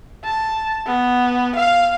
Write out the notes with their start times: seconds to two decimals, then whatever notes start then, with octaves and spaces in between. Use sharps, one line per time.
0.24 A5
0.86 B3
1.56 F5